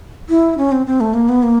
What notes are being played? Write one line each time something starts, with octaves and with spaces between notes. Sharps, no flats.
E4
C#4
C4
C4
A3
A#3
B3
A#3